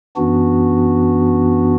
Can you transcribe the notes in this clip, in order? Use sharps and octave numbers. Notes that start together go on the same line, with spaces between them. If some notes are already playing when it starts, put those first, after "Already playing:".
F#2 E3 B3 D4 F#4